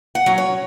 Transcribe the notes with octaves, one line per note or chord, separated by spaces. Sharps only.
F#5
F#3 C#4
C#5